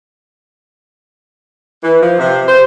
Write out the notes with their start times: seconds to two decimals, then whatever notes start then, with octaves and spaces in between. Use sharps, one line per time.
1.82 E3
2.00 F3
2.19 C3
2.47 C5